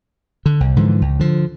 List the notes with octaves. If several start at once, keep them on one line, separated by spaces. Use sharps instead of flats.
D3
C2
G#2 D3 E3 F3
C#2
D3 F3